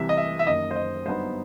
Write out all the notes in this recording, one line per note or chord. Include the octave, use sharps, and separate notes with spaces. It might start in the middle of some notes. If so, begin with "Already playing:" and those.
Already playing: C2 C3 E3 E5
D#5
E5
E5
F#1 F#2 D#3 D#5
C5
D#5
G1 G2 F#3 B3 D#4 C5